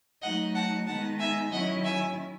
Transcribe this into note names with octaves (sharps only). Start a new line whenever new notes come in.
F#3 A3 D#4 D#5 F#5
F#5 A5
D#3 G#3 B3 D#4 F#5 A5
E5 G#5
D#3 F#3 C#4 E4 D#5 F#5
E5 G#5